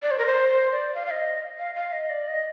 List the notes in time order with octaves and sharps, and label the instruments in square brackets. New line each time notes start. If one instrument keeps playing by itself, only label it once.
[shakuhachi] D5
C5
A#4
C5
D5
F5
F5
D#5
F5
F5
D#5
D5
D#5